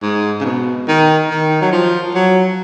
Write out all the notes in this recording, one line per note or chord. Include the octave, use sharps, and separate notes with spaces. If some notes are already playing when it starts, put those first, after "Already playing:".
G#2
C#3
B2
D#3
D#3
F#3
F3
F#3